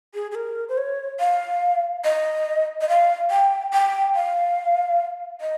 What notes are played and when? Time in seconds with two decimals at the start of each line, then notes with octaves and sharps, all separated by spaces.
0.14 G#4
0.31 G#4
0.35 A#4
0.69 C5
0.78 C#5
1.20 F5
2.04 D#5
2.81 D#5
2.89 F5
3.31 G5
3.73 G5
4.15 F5
5.41 D#5